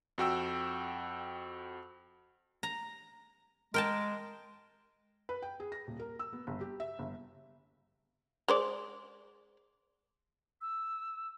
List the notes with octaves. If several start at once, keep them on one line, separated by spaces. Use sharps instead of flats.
F2 F#4 G5 E6
A#5
G#3 A#4 G5 A5
B4
G5
G#4
A#6
D#1
A#4
E6
B3
G1
G4
E5
G1
G#3 C5 D5
E6